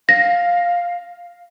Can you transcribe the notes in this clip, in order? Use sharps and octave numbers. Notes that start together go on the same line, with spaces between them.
F5 A#6